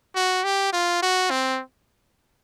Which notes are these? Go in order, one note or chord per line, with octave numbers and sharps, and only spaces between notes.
F#4
G4
F4
F#4
C4